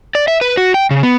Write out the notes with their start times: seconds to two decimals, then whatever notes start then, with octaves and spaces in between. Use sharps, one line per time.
0.15 D5
0.28 E5
0.41 B4
0.57 F#4
0.74 G5
0.91 C#3
1.03 B3